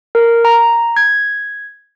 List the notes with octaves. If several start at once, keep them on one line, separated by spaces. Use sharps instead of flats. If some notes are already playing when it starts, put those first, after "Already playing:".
A#4
A#5
G#6